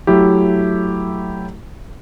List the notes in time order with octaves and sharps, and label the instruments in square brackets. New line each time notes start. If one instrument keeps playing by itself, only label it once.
[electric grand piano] F#3 A3 E4 G4